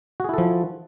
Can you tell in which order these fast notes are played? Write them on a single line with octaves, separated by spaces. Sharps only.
F#4 G#4 E4 A4 F3